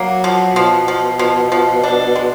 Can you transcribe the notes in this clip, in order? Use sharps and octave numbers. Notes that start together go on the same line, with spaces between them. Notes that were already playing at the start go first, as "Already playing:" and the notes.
Already playing: F#3 A#3
F3
B2 F3
F3
F3
F3
D4
G#3